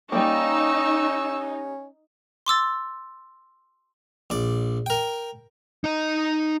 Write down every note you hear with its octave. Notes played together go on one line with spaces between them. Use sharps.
G3 A#3 C#4 D#4 C#6 E6
C6 D6 E6 A6
A#1 D5
A#4 G5
D#4 D#5